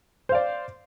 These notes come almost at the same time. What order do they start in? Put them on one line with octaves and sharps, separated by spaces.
C5 F5 D5